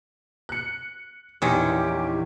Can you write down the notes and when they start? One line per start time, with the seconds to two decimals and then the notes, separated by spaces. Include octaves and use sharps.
0.49 F#6 C#7
1.42 A#1 E2 D#3 E3 C#4 D#4 G4 C6